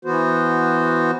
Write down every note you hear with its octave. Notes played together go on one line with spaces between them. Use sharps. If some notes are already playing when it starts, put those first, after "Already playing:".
E3 B3 F#4 C5